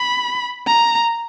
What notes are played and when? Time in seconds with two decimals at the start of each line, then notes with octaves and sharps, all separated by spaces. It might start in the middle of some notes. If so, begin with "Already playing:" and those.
Already playing: B5
0.67 A#5